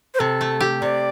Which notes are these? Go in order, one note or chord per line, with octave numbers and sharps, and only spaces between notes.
C5
C3 A4
A3
G4
C3 D5